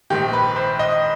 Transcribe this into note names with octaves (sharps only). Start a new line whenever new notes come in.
A#1 G#2 D#3 G4
B4
C5
D#5